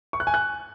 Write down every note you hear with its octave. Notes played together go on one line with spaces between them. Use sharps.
C#6
F#6
G#5
F#6